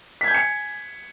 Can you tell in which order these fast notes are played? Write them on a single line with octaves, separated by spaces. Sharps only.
B6 G#6 G6 G#5 C#7